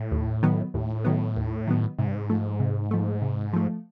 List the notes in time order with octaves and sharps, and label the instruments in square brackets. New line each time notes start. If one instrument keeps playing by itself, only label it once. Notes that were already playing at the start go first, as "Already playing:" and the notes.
Already playing: [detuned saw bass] A2
[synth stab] D#2
D#3 F#3 B3
[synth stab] D#2 [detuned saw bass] A2
[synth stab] D#3 F#3 B3
D#2
D#3 F#3 B3
[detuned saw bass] G#2 [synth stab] C3
[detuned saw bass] G2
G#2
[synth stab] F3 A3
C3
F3 A3
C3
F3 A3